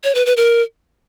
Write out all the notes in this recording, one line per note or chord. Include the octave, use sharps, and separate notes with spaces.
C#5
B4
B4
A#4